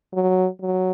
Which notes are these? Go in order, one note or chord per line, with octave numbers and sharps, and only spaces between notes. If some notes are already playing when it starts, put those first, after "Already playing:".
F#3
F#3